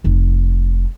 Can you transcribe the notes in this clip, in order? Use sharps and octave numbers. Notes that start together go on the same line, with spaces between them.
F1 D#4